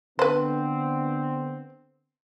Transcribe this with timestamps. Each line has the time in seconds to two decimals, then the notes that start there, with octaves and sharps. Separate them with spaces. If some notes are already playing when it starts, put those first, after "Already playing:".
0.19 D3 B3 C4 B4 C5